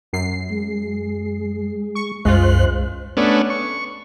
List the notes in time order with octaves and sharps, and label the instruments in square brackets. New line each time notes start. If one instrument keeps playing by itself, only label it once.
[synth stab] F#2 C7
[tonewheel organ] G#3
[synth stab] C#6
[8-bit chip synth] C2 F#2 [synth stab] G#3 F4 [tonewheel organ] C5 F#6
[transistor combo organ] A3 B3 C#4 D4
C#6